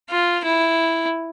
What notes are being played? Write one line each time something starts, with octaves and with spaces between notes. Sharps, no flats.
F4
E4